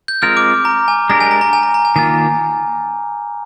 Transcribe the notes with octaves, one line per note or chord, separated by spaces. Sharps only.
G6
G#3 C4 F4 A#4 F6
D6
A#5
G#5
G#3 D4 G4 A#4 A#5
G#5
A#5
A#5
G#5
A#5
A#5
G#5
D#3 A#3 F4 G#5